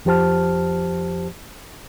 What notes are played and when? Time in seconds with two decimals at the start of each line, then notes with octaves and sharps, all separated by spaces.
0.05 F2 F3 G4 C5 A5 F6